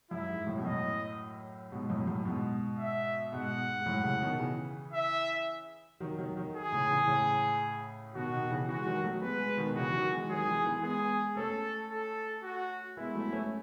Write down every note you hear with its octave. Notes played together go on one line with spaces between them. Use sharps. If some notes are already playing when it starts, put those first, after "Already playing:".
F#2 E4
G#2
F#2 A2
B2
F#2 A2 D#5
G#2 B2
F#2 A2
F#2 A2
G#2 B2
E5
G#2 B2 F#5
G#2
G#2
G#2
F#2 A2
A2 C#3
B2 D#3
C#3 E3
E5
D#3 F#3
D#3 F#3
D#3 F#3
G#4
A2 C#3
C#3 E3
A2 C#3
B2 D#3 F#4
B2 D#3
C#3 E3
E3 G#3 F#4
D#3 F#3
F#3 A3
G#3 B3 B4
G#3 B3
B2 D#3
C#3 E3 F#4
D#3 F#3
E3 G#3
D#3 F#3 G#4
E3 G#3
E3 G#3
G#3 B3 G#4
A3 C#4 A4
A4
F#4
G#3 B3 E4
F#3 A3
A3 C#4